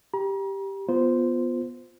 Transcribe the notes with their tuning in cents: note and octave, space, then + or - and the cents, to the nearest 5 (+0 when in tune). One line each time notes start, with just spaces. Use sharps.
G4 +0 A#5 +40
B3 +0 F4 +0 C5 -10